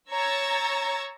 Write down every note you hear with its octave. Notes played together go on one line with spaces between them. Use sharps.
C#5 A#5 C#6 E6 G#6 A6